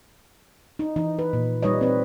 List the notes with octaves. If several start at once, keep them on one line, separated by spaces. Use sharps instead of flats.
D#4
E3 D#4
B4
A#2
G3 D#4 B4 C#5 D#5
C4 B4